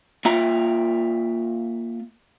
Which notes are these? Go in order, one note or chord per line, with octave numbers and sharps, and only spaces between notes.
A#3 F4 E5 G5 A#5